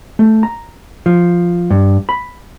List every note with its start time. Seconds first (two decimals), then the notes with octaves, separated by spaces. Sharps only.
0.19 A3
0.43 A#5
1.06 F3
1.70 G2
2.09 B5